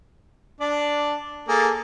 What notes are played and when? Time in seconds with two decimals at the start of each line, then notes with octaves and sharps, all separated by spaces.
0.61 D4 D5
1.48 A#3 G#4 A4